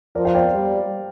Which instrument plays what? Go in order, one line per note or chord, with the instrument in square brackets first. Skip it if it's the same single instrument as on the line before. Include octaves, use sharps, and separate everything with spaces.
[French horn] F3 [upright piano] A#4 D5
[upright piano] C5 F5
D5 G5
[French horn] G3